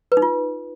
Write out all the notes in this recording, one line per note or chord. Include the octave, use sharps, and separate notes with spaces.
B4
D#4
F4